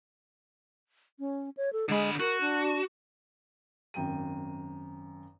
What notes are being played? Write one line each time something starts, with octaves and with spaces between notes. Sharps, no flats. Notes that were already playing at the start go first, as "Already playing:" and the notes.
C#4
C#5
A4
D3 G#3 B5
F#4 A#4
D4
G#1 F#2 G5 D#7